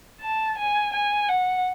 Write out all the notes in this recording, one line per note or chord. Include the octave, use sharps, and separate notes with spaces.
A5
G#5
G#5
F#5